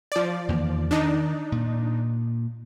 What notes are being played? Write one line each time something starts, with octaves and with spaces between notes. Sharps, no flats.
F3 D5
E2 D#3 A#3
D#3 D4 D#4
A#2